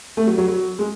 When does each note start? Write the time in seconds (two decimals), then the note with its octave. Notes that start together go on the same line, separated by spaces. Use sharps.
0.17 A3
0.27 F#3
0.38 F#3
0.48 F#3
0.79 G#3